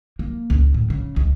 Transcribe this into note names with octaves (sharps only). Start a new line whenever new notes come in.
A#3
C#2
A2
C#3
C#2